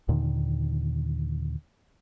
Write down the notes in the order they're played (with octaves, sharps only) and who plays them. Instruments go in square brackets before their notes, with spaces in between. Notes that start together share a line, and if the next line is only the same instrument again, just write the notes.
[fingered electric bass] D#2 A#2 D3 D#3